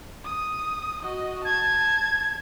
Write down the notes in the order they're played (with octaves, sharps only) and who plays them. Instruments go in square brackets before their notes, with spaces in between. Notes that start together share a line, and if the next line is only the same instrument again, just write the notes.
[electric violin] D#6
F#4 D#5
[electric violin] A5 [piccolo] G#6